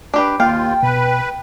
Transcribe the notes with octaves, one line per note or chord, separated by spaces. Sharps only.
D4 G4 B4
D#2 A#3 F4 F5 G5
B2 B4